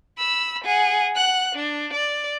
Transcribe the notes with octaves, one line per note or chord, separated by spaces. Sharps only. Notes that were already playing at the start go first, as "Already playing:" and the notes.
B5 E6
G#4 F#5
F#5 F#6
D4
D5